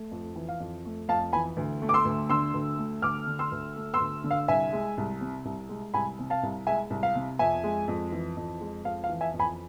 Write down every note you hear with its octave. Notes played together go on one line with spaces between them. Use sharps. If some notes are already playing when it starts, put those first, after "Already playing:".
Already playing: A3
F2
E3
F5
F2
A3
F2 F5 A5
E3 G#5 B5
D2
A3
D6
C6 E6
D2
D3 C6 E6
D2
A3
D2 D6 F6
D3
C6 E6
D2
A3
C6 E6
D2
D3
F5
C2 E5 G#5
G#3
C2
C3
C2
G#3
C2 G#5 B5
C3
F5 A5
C2
G#3 E5 G#5
C2
F5
C3
F2 E5 G#5
G#3
F2
E3
F2
G#3
F2 F5
F5
E3
E5 G#5
F2
G#5 B5